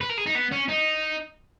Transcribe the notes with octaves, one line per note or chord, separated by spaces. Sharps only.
B4
A#4
G#4
D#4
B3
C#4
D#4